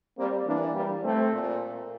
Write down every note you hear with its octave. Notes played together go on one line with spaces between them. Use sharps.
G3 A#3 C4
E3 A#3 D4
G3 A#3
A3 C4
A#2